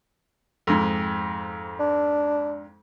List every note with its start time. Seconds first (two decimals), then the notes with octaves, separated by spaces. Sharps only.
0.67 F2 G#2
1.79 D4